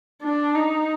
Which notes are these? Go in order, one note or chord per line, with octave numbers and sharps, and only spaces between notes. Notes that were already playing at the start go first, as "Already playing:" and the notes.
D4
D#4